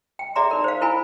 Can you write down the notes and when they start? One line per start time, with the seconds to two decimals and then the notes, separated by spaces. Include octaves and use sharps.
0.19 G5
0.36 G#4 D5 E5 A#5 C6
0.51 D#4 A#4
0.64 C5 F5
0.81 E4 A#4 G#5 B5